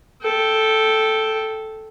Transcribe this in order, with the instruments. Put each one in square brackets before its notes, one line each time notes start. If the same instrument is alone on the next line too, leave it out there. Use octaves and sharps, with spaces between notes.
[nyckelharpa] A4 G5